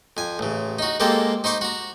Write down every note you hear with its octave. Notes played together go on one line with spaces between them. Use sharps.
F2 G#5
A1 C#3
D#4 F#4
G#3 A#3 C4 G4 A4
D#4 C5 C#6 D6
F#4 A#5